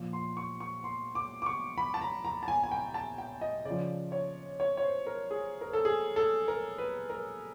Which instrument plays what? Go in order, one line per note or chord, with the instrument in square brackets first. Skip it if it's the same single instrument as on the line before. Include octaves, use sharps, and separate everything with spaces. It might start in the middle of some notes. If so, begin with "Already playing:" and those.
Already playing: [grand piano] A#2 F3
C6
C#6
C#6
C6
D6
D6
C#6
B5
A5
A#5
A#5
A5
G#5
G#5
G5
A5
G5
D#5
C#3 F3 D5
C#5
C#5
C#5
C5
A#4
G#4
A#4
A4
G#4
A4
A#4
B4
A#4